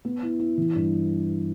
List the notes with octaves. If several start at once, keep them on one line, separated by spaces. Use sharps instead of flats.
B3
E4
E4
E3
G2